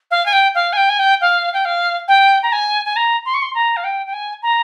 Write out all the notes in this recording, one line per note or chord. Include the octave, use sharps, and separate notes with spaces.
F5
G#5
G5
F5
G#5
G5
G#5
G5
F5
G5
F5
G5
A#5
G#5
G#5
A#5
C6
C#6
C6
A#5
F5
G5
G5
G#5
A#5